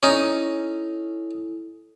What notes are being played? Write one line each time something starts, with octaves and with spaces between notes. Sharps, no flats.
C#4 D#4 E4 A4